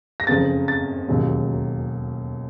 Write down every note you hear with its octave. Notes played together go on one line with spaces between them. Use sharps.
A#6
F#1 F2 C#3 A6
A6
E1 D#2 C#3 F#3